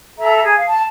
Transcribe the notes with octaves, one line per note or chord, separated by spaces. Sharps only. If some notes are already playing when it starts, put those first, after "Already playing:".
A4 E5 A#5
G#4
F5
A5